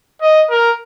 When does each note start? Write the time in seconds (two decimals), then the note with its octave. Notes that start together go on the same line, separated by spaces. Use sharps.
0.22 D#5
0.50 A#4